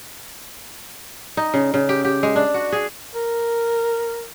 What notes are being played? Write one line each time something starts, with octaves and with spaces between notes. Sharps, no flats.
D#4
C#3
C#3
G4
G4
G#3
D4
F#4
G#4
A#4